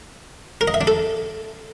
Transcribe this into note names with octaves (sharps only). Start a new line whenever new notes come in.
A#4
D#5
E5
D4
A4